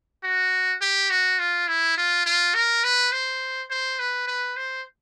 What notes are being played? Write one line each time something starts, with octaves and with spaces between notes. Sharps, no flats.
F#4
G4
F#4
F4
E4
F4
F4
A#4
B4
C5
C5
B4
B4
C5